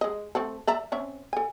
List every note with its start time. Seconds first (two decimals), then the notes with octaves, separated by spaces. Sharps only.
0.01 G#3 D#5
0.35 A3 C4 A4
0.67 D5 E5 A#5
0.92 C4 C#4 E5
1.33 A4 G#5